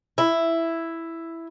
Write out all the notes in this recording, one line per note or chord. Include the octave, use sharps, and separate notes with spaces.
E4